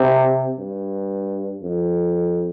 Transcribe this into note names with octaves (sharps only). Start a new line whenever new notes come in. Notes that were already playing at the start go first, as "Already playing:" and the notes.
Already playing: C3
G2
F2